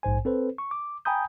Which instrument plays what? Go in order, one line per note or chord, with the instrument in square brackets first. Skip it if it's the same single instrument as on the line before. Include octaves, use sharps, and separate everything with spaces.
[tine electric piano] A#1 G#2 C5 G#5
C4 A4 B4 C5
C#6
D6
G5 G#5 A#5 B5 D#6 G6